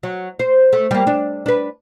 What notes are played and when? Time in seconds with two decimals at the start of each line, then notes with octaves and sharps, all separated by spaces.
0.03 F#3
0.39 C5
0.73 A3
0.91 G3 A#3
1.07 D4
1.46 D4 B4